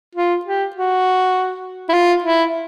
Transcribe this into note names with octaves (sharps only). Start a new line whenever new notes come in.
F4
G4
F#4
E4
F4
E4